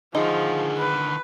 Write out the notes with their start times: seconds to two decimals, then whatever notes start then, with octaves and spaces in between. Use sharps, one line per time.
0.15 D3 D#3 F3 D#4 G#4
0.78 B4